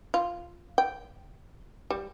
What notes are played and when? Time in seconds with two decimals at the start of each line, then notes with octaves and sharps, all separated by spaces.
0.14 F4
0.78 G5
1.90 G3